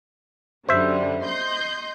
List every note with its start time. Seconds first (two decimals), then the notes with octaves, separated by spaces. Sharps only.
0.69 F#2 D3 G3 C5 E5
1.26 D#5 C6 G6